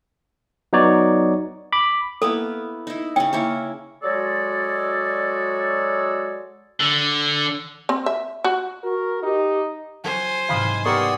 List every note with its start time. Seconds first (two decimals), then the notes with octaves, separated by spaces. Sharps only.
0.73 F#3 B3 D#4 C#5 D5
1.73 B5 D6
2.22 A#3 B3 E4 A4
2.87 D#4 E4
3.16 C#3 C#4 G5
3.33 A#3 E4 C#5
4.03 F#3 G#3 F#4 G#4 A4 D5
6.80 D3
7.89 C4
8.06 E5
8.44 F#4
8.83 F#4 A#4
9.23 D#4 G4
10.04 F#3 C#4 C5 G#5
10.49 G#2 C3 E3 F5 B5 D#6
10.85 B3 G4 A#4 D5 C#6 D#6